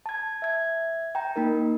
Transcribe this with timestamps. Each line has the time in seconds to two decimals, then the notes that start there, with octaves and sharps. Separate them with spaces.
0.06 A5 G#6
0.42 E5 G#6
1.15 G5 A#5
1.36 A#3 D#4 A#4